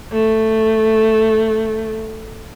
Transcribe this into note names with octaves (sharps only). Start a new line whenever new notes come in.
A3